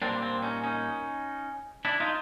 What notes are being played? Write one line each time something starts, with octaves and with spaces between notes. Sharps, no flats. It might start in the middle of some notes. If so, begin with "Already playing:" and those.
A#2 G3 A#3 C4 D4
C4 D4
C#4 D#4
C#4 D#4
D4 E4
D#4 F4